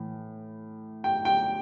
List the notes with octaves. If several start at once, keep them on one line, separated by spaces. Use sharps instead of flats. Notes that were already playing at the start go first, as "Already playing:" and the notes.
Already playing: A2 E3
G5
G5